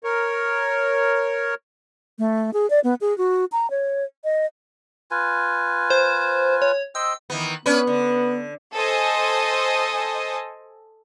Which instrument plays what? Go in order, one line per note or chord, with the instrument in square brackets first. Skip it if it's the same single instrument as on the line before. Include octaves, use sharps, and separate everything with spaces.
[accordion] A#4 C#5
[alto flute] A3
G#4
D5
B3
G#4
F#4
A#5
C#5
D#5
[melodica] F4 B4 G#5
[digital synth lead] C5
C#5
[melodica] C5 D#5 G5 [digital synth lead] E6
[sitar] D#3 E3 B3
[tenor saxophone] B3 [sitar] C#4 D4 B4
[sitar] D3
[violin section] A4 C5 D#5 G#5